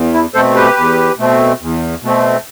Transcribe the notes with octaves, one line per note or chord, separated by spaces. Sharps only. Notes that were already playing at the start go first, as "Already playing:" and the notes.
Already playing: E2
E4
B2 A3 C4 A4 C5
G4 B4
E2
B2 A3 C4
E2
B2 A3 C4